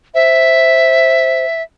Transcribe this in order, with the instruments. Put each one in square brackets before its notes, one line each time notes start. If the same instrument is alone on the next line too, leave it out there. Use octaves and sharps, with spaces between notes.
[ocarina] C5 [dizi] E5